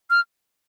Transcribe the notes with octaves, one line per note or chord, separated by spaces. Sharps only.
F6